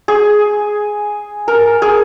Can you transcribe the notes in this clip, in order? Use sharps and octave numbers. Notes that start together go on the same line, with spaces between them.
G#4
A#4
G#4